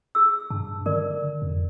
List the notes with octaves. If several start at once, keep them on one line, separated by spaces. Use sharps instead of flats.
G#4 E6
G2 A5
D3 A#4 D5
F2